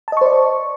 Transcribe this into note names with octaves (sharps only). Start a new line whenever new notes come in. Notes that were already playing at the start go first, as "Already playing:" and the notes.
C5 D5 D#5 A5 C#6